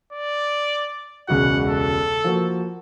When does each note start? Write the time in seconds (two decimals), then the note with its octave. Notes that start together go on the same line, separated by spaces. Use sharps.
0.13 D5
1.28 E1 C#2 F#4 F#5
1.68 A4
2.24 F3 A#3 F#4